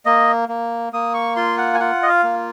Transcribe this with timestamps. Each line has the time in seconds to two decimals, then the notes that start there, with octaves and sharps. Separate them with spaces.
0.05 A#3 D#5
0.49 A#3
0.93 A#3 D#6
1.14 C#6
1.36 F4 C6
1.58 F#5
1.74 G#5
1.80 F4 F#5
2.03 D#5
2.09 F5
2.23 A#3